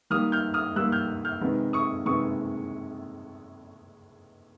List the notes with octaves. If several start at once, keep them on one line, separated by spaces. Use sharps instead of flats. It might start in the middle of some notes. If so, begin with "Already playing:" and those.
D#3 G3 A#3 D#6 F6
F6 G6
D#6 F6
D#3 G3 A#3 E6 F#6
F6 G6
F6 G6
C3 D#3 G#3 B3
C#6 D#6
C3 D#3 G#3 B3 C#6 D#6